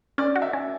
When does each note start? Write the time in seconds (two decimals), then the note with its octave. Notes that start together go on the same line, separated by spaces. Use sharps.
0.18 C#4 D5
0.36 F#4
0.42 E5
0.53 C#4